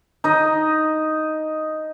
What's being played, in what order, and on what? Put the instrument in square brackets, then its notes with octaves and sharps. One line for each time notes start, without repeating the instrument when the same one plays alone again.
[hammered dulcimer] D#4 D#5